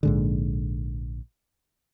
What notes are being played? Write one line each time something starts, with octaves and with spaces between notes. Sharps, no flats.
A#1 G#2 D3